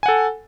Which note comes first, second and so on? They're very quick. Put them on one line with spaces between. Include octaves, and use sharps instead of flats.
G#5 F#5 A4